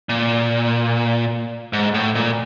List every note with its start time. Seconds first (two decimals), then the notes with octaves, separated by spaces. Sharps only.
0.09 A#2
1.73 G#2
1.94 A2
2.15 A#2